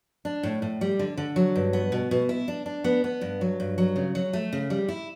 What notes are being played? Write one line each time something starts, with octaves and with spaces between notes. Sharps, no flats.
D4
A2
A2
G3
D3
D3
F#3
G2
B3
B2
B2
E4
D4
D4
B3
B3
G2
F#3
G2
F#3
C#3
F#3
A3
C#3
G3
E4